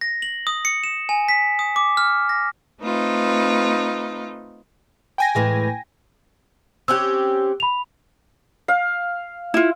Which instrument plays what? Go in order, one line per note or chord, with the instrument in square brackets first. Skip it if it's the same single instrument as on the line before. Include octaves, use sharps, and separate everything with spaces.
[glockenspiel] A#6
F#7
D#6
C#7
E7
G#5
B6
D#6
D6
F6
A#6
[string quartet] A3 C4 D#4 F4 B4
[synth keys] G5 G#5 A#6
[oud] A2 E3 G#3
[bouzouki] C4 C#4 G4 [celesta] E6 F#6
[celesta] B5 F7
[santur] F5
[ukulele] E4 F4